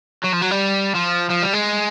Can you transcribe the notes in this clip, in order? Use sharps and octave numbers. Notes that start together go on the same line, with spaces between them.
F#3
F3
F#3
G3
F3
F3
G3
G#3